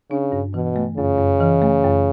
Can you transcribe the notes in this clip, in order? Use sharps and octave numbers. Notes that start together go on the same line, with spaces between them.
C#3 D4
G2
B2 E3
A3
F#2 C#3
F#2
E3
A3
F#2